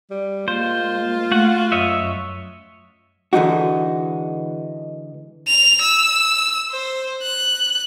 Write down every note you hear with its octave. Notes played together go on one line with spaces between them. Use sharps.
G3
G#3 A#3 F4 C5
A3 F#4 F#5
F#2 C#5 D#5 E5
D3 E3 G#3 D#4 F#4
F7
E6
C5
F#6